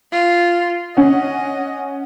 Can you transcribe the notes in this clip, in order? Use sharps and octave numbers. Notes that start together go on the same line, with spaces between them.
F4
C#4 D#5 F#5